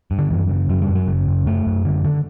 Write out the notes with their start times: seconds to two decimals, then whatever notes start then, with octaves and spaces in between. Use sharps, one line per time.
0.11 G2
0.19 D3
0.30 F#2 E3
0.49 C#3
0.69 F#2 F#3
0.82 G3
0.89 F#2
0.95 F#3
1.07 C#3
1.28 F#2
1.46 F#2 A3
1.66 F#2
1.85 D3
2.05 D3